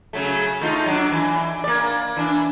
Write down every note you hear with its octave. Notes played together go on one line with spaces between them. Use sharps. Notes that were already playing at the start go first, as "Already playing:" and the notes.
C#3 F#3 A3
A3 D#4 F4
F#3 D4
E3
A#3 D5
E3 D4